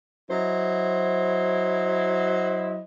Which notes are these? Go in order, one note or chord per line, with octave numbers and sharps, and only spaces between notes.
F#3 E4 C5 D#5